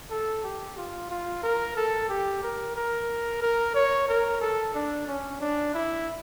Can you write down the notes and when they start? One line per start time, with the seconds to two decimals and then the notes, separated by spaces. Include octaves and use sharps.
0.11 A4
0.44 G4
0.77 F4
1.10 F4
1.43 A#4
1.77 A4
2.09 G4
2.43 A#4
2.76 A#4
3.42 A#4
3.75 C#5
4.09 A#4
4.41 A4
4.75 D4
5.07 C#4
5.40 D4
5.74 E4